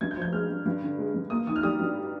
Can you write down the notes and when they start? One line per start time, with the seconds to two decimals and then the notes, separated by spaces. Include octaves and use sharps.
0.01 G2 G#6
0.11 G6
0.17 F3
0.22 G6
0.33 G#3 F6
0.49 G2
0.65 G2
0.82 D3
0.98 G#3
1.14 G2
1.30 A#3 D#6
1.47 D#3 D#6
1.56 F6
1.63 G3 D#6
1.79 G2